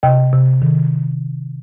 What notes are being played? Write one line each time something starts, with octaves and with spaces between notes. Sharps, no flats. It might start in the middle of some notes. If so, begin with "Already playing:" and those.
C3 D#5 G5
C3
D#3